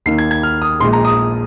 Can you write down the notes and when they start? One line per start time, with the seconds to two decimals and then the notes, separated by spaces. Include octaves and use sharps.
0.06 D#2 D#3 A#3 C7
0.18 G#6
0.31 G#6
0.43 F6
0.62 D#6
0.80 A#1 A#2 G#3 C6
0.93 A#5
1.05 D#6